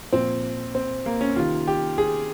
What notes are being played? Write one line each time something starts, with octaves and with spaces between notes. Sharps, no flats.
A#2 F3 C4
C4
A#3
C#4
C3 D#3 F4
G4
G#4